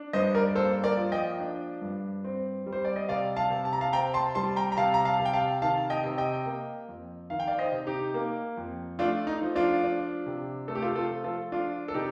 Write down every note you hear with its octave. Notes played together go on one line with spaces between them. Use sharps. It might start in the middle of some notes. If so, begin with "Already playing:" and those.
Already playing: D4
G2 C5 D#5
A#4 D5
A#3 A4 C5
A#4 D5
F3
D#5 G5
D4
G2
C4
G3
C5
D5
D#5
C3 D5 F5
F5 A5
C3
A5
A#5
F5 A5
C4 G5 A#5
A5 C6
G3 A5 C6
G5 A#5
A#5
C3 F5 A5
A#5
F5 A5
C3
G5
F5 A5
D#3 F5 A5
D#5 G5
C3
D#5 G5
A#3
F2
D#3 F5
G5
D5 F5
C5 D#5
C3
D#4 G4
A#3
F2
A3 D4 F4
D#4
F3
D4 F4
D4
C3
A3 A4
G4
F4 A4
F4 A4
F3
F4 A4
D4 F4
A4
C3 D#4 G4